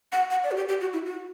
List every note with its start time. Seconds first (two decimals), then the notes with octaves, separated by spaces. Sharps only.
0.12 F#5
0.30 F#5
0.44 D5
0.51 F#4
0.56 G4
0.69 G4
0.81 F#4
0.93 E4
1.06 F#4